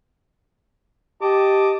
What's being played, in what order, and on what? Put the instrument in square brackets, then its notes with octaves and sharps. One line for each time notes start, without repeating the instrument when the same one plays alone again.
[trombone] G4 [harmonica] D#5 A5 D6